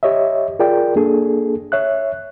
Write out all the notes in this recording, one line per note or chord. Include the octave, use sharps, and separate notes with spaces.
G4 C#5 D#5 E5
F4 G#4 A#4 D5 G5
A#3 D4 G#4 A4
C#5 E5 F#6